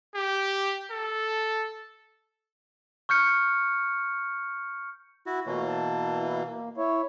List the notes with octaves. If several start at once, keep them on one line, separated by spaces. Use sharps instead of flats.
G4
A4
C#6 F6 G6 C#7
E4 F#4
B2 E3 A3 A#3 F4 C#5
A5
E4
A#3
E4 C#5